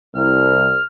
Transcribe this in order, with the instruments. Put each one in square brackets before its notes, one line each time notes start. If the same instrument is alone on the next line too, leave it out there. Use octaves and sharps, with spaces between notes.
[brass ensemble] C2 [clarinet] F6